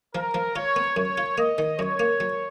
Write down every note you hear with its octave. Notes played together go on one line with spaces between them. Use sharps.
F3 A#4
F3
F4 C#5
B3
F#2 C#5
F4
A#3 D#5
D#3
F#2 C#5
A#3
F#3